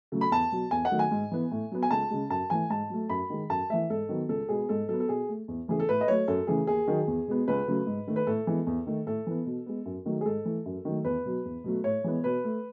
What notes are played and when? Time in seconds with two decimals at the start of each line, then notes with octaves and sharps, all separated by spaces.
0.12 C#3 F#3 A3
0.21 B5
0.31 E2 A5
0.52 B2 F#3
0.71 E2 G#5
0.85 F#5
0.91 D#3 F#3 A3
0.99 G#5
1.11 G#2
1.32 E3 B3
1.51 A2
1.72 F#3 B3
1.83 G#5
1.91 C#2 A5
2.11 C#3 G#3
2.30 F#2 A5
2.50 E3 A3 G#5
2.70 G#2 A5
2.90 F#3 A3
3.09 F#2 B5
3.30 D#3 G#3
3.50 F#2 A5
3.70 E3 A3 E5
3.90 G#2 A4
4.09 D#3 F#3 B3
4.29 C#2 A4
4.49 B2 G#3 B3 G#4
4.69 G#2 A4
4.89 F#3 A4
4.93 B3
5.00 A4
5.09 B2 G#4
5.29 A3
5.48 E2
5.68 C#3 E3 A3 G#4
5.80 A4
5.89 A2 B4
6.01 D#5
6.08 F#3 A3 C#5
6.28 F#2 A4
6.47 C#3 E3 A3 G#4
6.67 D#2 G#4
6.88 D#3 F#3
7.07 E2
7.28 B2 G#3 B3
7.48 C#2 B4
7.68 C#3 F#3 A3
7.87 G#2
8.07 D#3 A3
8.16 B4
8.27 A2 A4
8.47 E3 G#3 B3
8.67 E2
8.86 D#3 A3
9.07 A2 A4
9.27 E3 B3
9.46 B2
9.66 G#3 B3
9.86 F#2
10.06 D#3 F#3 A3
10.21 G#4
10.25 G#2 A4
10.45 E3 A3
10.66 F#2
10.85 D#3 F#3 A3
11.05 E2 B4
11.26 B2 F#3
11.45 E2
11.64 B2 F#3 A3
11.84 A2 C#5
12.04 E3 G#3 B3
12.24 B2 B4
12.44 A3